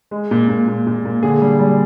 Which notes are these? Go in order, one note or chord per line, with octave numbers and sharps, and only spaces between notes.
G#3
A#2
A#2
A#2
A#2
A#2
D3 G#4
G3
G3